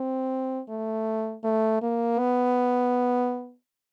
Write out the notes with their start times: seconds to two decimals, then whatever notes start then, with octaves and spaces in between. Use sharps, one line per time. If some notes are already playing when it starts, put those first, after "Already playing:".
Already playing: C4
0.69 A3
1.44 A3
1.82 A#3
2.19 B3